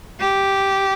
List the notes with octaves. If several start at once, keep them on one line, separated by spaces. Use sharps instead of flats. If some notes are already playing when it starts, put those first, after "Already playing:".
G4